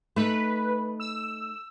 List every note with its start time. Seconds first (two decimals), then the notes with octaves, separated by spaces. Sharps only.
0.16 A3 D#4 B4
1.00 E6